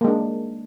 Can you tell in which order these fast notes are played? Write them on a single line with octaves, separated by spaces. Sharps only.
A#3 G#3 D4